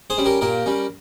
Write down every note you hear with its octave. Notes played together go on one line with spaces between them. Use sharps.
G#4 C5
G3 C#4
G4 A#4
A#2 G4 A#4
G3 C#4